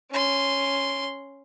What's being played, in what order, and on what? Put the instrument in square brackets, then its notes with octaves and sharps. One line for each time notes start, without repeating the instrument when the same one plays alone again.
[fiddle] C#4 C6